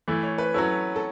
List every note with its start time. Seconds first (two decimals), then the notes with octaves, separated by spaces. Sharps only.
0.08 E3 A3 E4
0.23 C#5
0.38 B4
0.54 F#3 C#4 E4 A4
0.96 A4